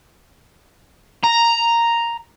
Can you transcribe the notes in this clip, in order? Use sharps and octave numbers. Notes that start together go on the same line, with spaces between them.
A#5